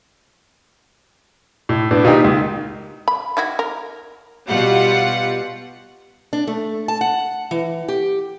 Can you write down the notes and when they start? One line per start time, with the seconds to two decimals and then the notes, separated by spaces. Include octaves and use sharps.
1.69 A2
1.91 A2 B3 D4
2.04 A#2 D#3 D#4 G4
2.24 C#2
3.08 B5
3.37 D#3 E4 F#4
3.59 A#4
4.48 B2 G3 F4 F#5
6.33 D4
6.47 A3
6.88 A5
7.01 F#5
7.51 E3
7.88 G4